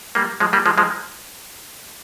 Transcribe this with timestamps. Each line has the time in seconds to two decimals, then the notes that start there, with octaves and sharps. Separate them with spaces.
0.15 G3 A#3
0.40 F3 G#3
0.53 G3 A#3
0.66 F3 G#3
0.78 F3 G#3